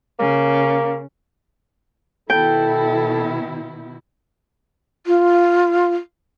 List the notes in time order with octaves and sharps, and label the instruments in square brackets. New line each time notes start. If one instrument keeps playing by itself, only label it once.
[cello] C#3 [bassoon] A#3
[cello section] B2 D#3 E4 [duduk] A4 [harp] G5
[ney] F4